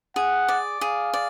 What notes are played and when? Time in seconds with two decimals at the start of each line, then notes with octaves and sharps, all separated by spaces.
0.16 G#4 F#5
0.49 D5
0.81 G#4 F5
1.14 D5